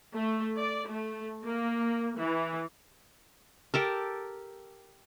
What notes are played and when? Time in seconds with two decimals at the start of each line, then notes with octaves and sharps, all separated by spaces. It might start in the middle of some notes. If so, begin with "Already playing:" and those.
0.13 A3
0.57 D5
0.88 A3
1.44 A#3
2.17 E3
3.74 G4 A4 A#4